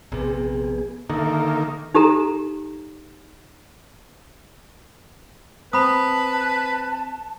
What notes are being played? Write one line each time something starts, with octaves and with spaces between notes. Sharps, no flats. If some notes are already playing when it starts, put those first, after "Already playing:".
A#1 C3 B3 G#4
D3 D#3 A#3 A4 E5
D#4 G4 A4 A#5
C4 B4 A5 B5 D#6